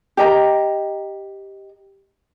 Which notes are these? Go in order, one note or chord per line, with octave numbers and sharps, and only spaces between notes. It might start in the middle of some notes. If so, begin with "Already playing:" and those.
G4 D#5 A#5